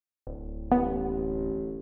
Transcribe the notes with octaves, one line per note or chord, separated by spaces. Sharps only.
D1
A1 B3